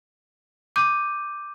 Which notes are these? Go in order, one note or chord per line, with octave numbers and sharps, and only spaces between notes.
D6 G6 D#7